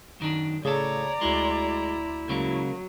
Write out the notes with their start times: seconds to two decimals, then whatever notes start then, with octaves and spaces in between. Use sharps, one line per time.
0.20 F#2 D#3 D4
0.65 A2 C#3 G#4 A4 C#5 D5 A#5
1.21 D2 G#3 E4 F#4 C6
2.29 C#2 C#3 F#3 A#3